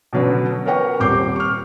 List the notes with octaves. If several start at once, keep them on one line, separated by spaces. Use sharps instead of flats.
B2 D3 F#3 B3 C#4
A#4 B4 C#5 F#5 G5 C#6
D#1 C4 G4 D6 G6 C7
C#6 F6